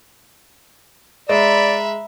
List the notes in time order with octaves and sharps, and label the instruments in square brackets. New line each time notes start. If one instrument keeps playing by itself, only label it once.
[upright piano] G#3 [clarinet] D5 [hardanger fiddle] E5 [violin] A#5 B5